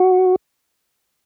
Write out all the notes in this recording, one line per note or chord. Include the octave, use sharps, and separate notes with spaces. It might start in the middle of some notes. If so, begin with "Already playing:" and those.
Already playing: F#4